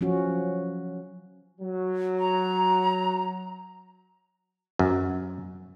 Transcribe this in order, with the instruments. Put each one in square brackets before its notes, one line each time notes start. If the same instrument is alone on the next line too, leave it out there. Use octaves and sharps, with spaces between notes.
[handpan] F3 F#3 C#4 F#4
[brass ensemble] F#3
[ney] A#5
[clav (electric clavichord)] F#2